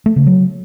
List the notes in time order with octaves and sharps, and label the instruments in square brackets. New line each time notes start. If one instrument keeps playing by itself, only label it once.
[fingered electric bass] A3
C#3
F#3